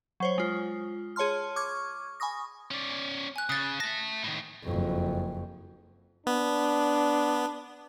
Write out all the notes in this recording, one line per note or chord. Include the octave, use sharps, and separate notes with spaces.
F#3 C5 C#5
G#3 F4
G#4 C#5 A5 C6 F6
C#6 D6 F6 G#6
G#5 B5 C#6 D#6 A#6
C#4 D5
G#5 F#6
C#3 D#6 A6
E5 A5 A#6
A2 D#3
F#1 F2
B3 D4